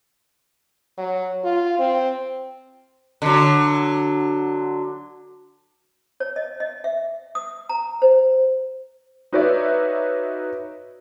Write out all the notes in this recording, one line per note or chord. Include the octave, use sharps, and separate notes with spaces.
F#3
F4
C4
D3 F#3
C#5
D#5
D#5
E5
D#6
A#5
C5
D#4 F#4 B4 C#5 D5 E5